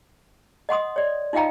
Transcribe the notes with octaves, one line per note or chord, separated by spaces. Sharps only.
D#5 F#5 C6 D#6
C#5 D5
D#4 F4 D#5 F5 G5 A#5